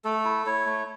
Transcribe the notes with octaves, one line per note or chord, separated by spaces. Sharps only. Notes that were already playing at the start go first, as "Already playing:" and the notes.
A3 A4
E4
E4 C#5
A3